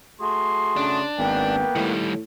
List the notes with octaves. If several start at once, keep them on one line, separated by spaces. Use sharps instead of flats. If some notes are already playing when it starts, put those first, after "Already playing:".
A3 F#4 G#4 C6
C#3 D4
G#1 A#3 B3 B4 G5
A2 D#3 G3